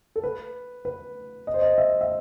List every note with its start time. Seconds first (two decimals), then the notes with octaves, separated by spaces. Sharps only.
0.16 A4
0.24 B4
0.85 B4
1.47 D#5
1.54 C5
1.62 D#5
1.78 E5
2.01 E5